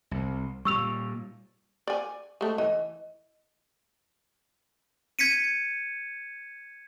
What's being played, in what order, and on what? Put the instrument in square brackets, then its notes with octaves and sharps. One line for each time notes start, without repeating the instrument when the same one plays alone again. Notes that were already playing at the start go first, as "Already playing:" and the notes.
[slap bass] C2
[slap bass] A#2 G3 [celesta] C#6 E6 F7
[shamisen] D5 G#5
G#3 A3
[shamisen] E3 [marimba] D#5
[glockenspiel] G#6 B6 C#7 D#7